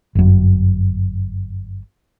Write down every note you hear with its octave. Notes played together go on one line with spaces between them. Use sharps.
G1 F#2